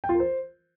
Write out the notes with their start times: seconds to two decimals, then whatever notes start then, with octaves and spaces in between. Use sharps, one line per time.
0.04 G5
0.09 F4
0.14 A#4
0.20 C5